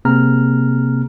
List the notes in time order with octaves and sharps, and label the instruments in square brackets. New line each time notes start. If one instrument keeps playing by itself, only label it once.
[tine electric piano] C3 A#3 C4 G#4 A#5 F6